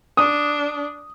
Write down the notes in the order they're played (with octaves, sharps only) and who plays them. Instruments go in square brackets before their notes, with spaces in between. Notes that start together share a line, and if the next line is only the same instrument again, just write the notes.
[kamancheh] D4 [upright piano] D#6